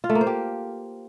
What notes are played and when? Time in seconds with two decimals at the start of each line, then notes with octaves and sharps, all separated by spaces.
0.04 F4
0.10 A3
0.15 A#3
0.21 C5
0.27 G4